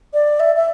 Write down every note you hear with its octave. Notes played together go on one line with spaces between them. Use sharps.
D5
E5
E5